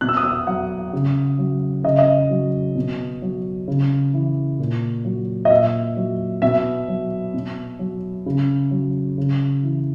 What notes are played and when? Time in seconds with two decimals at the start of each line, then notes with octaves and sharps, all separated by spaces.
0.01 B2 F#6
0.09 E6
0.17 D#6
0.24 E6
0.47 F#3 F#5
0.93 C#3
1.39 F#3
1.84 C#3 D#5
1.99 D#5
2.30 F#3
2.75 B2
3.22 F#3
3.68 C#3
4.13 E3
4.59 A#2
5.05 F#3
5.45 D#5
5.50 A#2 E5
5.97 F#3
6.42 B2 E5
6.88 F#3
7.34 B2
7.79 F#3
8.26 C#3
8.71 F#3
9.18 C#3
9.63 E3